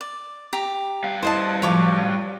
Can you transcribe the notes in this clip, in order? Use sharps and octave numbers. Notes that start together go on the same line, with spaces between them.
D5
G4 A#5
G3 F5
E4 A4 C5 D#5 A5
A2 F3 F#3 C#5 C#6 D6